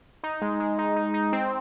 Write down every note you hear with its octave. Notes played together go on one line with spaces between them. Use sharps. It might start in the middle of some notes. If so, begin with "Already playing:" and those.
D#4
G#3
G#3
D#4
D#4
D#4
C4